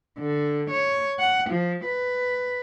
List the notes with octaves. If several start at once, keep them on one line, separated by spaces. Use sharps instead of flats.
D3
C#5
F#5
F3
B4